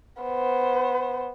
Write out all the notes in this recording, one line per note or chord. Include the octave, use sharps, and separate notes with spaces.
B3 C5